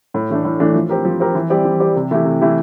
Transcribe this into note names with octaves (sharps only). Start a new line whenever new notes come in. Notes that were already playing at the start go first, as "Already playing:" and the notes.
A2
E3 A3 D4
A2
E3 A3 D4
F3
C4 G4 A#4
F3
C4 G4 A#4
E3
G3 C4 G4 D5
E3
G3 C4 G4 D5
C3
E3 A3 E4 G4
C3
E3 A3 E4 G4